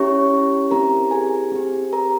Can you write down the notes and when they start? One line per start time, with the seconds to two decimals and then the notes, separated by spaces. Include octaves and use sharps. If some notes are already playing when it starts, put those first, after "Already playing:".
Already playing: C#4 E4 G4 C#5 C#6
0.71 C4 E4 G4 A#4 A#5
1.11 G#4 G#5
1.52 C4 G4
1.93 A#4 A#5